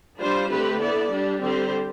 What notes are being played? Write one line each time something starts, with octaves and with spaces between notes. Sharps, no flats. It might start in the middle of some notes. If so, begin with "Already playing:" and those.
G3 D4 F4 C5
D3 A3 C4 G4 B4
B3 E4 A4 D5
G3 D4 G4
D3 G3 C4 G4 C5